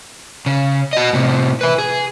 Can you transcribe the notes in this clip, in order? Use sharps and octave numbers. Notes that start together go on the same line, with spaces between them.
C#3
F#4 D#5
A2 C3
E4 B4
G#4